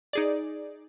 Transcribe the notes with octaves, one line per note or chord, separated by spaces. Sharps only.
D#4 G#4 D5